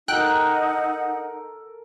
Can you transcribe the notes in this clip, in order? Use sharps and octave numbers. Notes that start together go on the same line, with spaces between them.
D#4 A4 A#4 F#5 G5 F#6